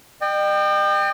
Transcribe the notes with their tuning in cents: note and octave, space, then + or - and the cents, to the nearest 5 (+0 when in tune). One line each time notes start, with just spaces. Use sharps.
D#5 -45 G5 +5